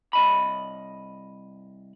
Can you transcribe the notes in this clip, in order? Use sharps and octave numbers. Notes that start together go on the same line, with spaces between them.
C2 D#5 B5